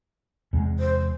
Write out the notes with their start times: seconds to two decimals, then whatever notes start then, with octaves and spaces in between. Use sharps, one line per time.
0.53 E2 C3 G#3
0.79 C5